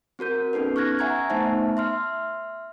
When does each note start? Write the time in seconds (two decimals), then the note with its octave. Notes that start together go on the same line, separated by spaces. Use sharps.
0.19 C4 F#4 A#4 G6
0.53 B3 C#4 D#4 A4 B4
0.76 C#6 F6 F#6 G#6 A#6
0.99 E5 F#5 G#5 A#5 C#6 G#6
1.30 A3 B3 D#4 C5 E5 A5
1.77 E5 C6 F6